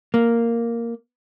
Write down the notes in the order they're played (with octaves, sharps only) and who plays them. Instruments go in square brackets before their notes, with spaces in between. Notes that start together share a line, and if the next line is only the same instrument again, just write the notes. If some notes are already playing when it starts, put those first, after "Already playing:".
[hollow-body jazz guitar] A#3